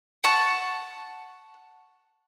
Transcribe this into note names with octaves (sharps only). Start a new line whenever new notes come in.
F#5 A5 C#6